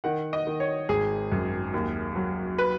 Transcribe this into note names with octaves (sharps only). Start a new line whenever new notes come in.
D#3 F#5
D#5
D#3
C#5
G#1 G#4
F#2
D#2
F#3
B4